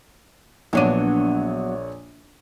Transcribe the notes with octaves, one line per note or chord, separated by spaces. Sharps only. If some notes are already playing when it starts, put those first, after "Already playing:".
A#1 F#3 B3 D4 C#5 D#7